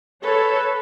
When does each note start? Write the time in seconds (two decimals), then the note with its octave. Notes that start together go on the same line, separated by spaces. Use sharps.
0.23 A4 B4 C#5